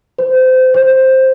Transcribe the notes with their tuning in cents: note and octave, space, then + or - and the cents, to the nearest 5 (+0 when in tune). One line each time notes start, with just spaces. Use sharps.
C5 -25
C5 +5